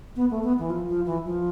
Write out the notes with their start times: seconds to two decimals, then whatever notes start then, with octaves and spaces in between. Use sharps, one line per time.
0.16 B3
0.30 A3
0.43 B3
0.59 E3
0.70 F3
0.88 F3
1.06 E3
1.25 F3